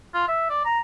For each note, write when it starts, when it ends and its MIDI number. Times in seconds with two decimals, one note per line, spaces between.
0.14 0.24 65
0.28 0.46 76
0.50 0.62 74
0.65 0.79 82